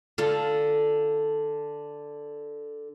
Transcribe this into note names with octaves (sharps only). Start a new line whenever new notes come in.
D3 F4 A4